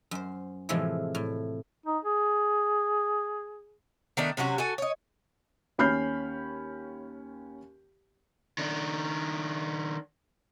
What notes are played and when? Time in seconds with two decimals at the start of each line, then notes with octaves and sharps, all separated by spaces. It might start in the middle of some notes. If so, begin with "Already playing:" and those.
0.11 F#2 C5
0.69 A2 C3 E3 F3 G#3
1.15 A2
1.86 D#4
2.04 G#4
4.17 D#3 A3 B3 D4
4.37 C3 F#3 C#4 F#4
4.58 F#4 A4 G#5
4.78 C#5 D#5
5.78 D#2 C#4 B5 F6 G6 C7
8.58 D#3 D4